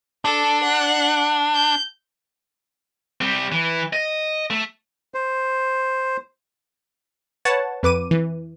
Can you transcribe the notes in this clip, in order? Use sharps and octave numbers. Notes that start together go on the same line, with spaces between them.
D4 A4
F#5
G6
G3 C4
E3
D#5
A3
C5
B4 C#5 F#5 A5 C#6 A6
F2 B4 D6 D#7
E3